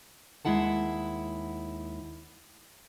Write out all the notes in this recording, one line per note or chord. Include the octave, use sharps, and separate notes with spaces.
D#2 G#3 E4 F#5 A5